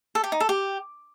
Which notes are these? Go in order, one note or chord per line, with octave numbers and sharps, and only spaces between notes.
A4
G4
D#4
A4
G4